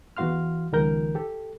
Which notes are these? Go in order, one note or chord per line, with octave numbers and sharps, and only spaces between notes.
E2 E3 F#4 F5 C6 F6
C#2 D#3 F3 A#4 G6
G4 A4